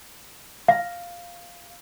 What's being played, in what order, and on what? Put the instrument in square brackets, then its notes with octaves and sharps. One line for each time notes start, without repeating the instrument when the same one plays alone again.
[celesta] F5